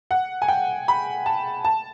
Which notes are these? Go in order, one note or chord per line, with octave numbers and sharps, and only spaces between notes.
F#5
G#5
G5
B5
A5
A5